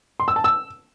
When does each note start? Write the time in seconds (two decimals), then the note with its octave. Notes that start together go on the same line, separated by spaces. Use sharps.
0.20 C6
0.28 E6
0.36 A5
0.44 E6